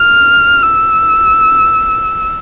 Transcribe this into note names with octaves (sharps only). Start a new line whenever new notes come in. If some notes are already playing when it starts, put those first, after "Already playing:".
Already playing: F6
E6